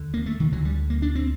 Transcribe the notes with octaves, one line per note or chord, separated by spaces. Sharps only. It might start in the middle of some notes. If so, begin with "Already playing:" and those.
Already playing: D#2 D3
A#3
A3
D#3
D2 D3 F#3
G3
A#3
D4
C4